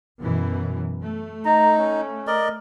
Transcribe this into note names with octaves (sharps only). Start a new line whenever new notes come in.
F#2 B2 E3
A3
D#4 A#5
C#4
A#4 D5 D#5